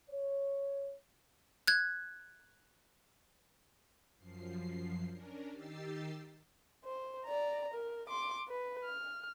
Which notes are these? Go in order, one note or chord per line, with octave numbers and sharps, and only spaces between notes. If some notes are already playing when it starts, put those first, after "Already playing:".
C#5
F#6 G#6
F#2 F3 C7
C#4 D4 A#4
D#3 D#4 G4 E6 A6 C7
C5
D5 A#5
A#4
C6 D6
B4
F6